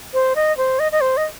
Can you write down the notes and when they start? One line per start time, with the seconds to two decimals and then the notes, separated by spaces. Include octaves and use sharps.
0.14 C5
0.36 D#5
0.57 C5
0.79 D#5
0.92 D#5
1.01 C5
1.17 D#5